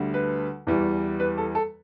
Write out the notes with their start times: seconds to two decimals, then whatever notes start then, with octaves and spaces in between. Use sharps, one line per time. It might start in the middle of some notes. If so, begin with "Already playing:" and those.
Already playing: D2 D3 G3
0.14 B4
0.67 E2 E3 G3
1.20 B4
1.38 A4
1.55 A4